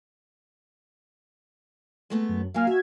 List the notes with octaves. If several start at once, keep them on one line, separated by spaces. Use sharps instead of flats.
G#3 A3 B3
F#2
F#3 A#3 F5 G#5 F6
F#4 E5 G#6